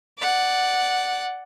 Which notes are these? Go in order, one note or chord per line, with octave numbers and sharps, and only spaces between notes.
D5 F#5